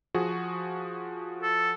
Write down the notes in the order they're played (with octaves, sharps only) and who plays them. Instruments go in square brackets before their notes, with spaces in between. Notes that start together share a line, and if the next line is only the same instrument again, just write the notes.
[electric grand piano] F3 F#4 G#4
[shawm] A4